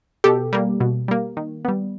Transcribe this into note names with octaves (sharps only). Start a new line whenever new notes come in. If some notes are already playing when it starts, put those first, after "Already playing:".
B2 G4 A4
G3 A#3
B2
G3 A#3
D#3
G3 B3